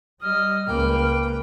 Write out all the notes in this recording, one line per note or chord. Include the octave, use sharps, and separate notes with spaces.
G3 D#5 F6
C#2 A#3 B4 G5